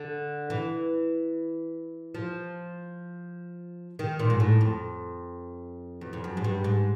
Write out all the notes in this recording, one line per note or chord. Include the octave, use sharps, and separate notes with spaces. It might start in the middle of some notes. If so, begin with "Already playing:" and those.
Already playing: D3
E3
F3
D#3
A#2
G#2
A2
F2
E2
F2
F#2
G#2
G2
G#2